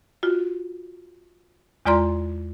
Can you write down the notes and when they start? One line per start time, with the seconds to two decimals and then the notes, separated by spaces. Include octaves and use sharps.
0.23 F4 F#4
1.85 E2 G#3 F4 D5 A#5 C6